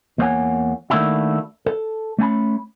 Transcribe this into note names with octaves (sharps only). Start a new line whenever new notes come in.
E2 A#3 C5 C#5 F#5 G#5
D#3 A3 A#3 D4 E4 F#4
A4
A3 C#4 G#5 B5